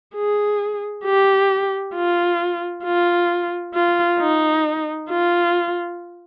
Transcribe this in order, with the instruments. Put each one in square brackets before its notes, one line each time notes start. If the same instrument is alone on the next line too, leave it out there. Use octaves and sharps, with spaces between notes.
[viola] G#4
G4
F4
F4
F4
D#4
F4